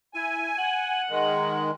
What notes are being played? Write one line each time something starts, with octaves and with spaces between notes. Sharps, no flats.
E4 G#5
F#5
D#3 G#3